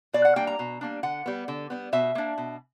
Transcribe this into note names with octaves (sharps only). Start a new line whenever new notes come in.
B2 D5
F#5
G3 A#3 D4 G5
A#5
B2
G3 A#3 D4
D3 F#5
G3 B3
D3
G3 B3
B2 E5
A#3 D4
B2